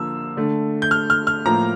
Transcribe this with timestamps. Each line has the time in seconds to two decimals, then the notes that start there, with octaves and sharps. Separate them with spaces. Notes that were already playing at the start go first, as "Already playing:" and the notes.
Already playing: D3 F3 A#3 E6
0.37 D3 A3
0.82 G6
0.91 F6
1.10 F6
1.27 F6
1.46 A2 F3 A#3 A#5